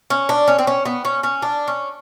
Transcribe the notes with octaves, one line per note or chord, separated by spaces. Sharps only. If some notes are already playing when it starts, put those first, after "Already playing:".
C#4
D4
C#4
C4
C#4
B3
C#4
C#4
D4
C#4